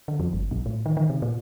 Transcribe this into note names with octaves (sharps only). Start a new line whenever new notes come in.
D3
F2
G1
B1
A2
D#3
D#3
C3
A#2